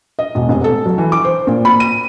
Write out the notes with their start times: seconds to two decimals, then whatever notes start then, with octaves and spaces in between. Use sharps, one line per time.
0.19 D#5
0.35 E1
0.49 F1
0.64 A4
0.86 F#3
0.98 E3
1.12 D6
1.25 C5
1.47 A#2
1.65 B5
1.80 D#7